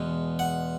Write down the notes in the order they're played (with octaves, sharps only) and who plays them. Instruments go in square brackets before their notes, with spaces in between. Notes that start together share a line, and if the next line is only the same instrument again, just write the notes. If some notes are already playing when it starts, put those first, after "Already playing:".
Already playing: [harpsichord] E2 B2 G#3
F#5